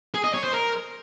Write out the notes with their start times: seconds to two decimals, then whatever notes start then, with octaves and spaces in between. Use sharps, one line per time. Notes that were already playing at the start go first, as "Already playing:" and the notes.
0.14 G#4
0.24 D#5
0.34 C#5
0.44 C5
0.54 A#4